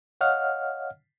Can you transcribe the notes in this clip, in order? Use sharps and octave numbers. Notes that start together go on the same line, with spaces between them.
C#5 D#5 F5 F#5 F6